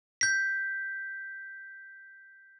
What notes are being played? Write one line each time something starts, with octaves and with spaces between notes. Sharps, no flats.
G6 B6